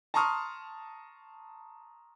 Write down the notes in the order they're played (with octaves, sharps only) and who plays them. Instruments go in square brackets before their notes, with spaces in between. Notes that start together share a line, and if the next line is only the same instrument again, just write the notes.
[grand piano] A5 A#5 C6 C#6 D#6 F6